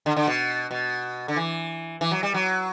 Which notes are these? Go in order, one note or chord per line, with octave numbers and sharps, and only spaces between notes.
D3
D3
B2
B2
D3
E3
E3
F#3
G3
F#3